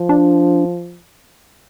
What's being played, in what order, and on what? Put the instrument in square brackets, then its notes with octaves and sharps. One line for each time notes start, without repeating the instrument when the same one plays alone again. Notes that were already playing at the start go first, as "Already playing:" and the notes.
Already playing: [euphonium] F3
[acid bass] D4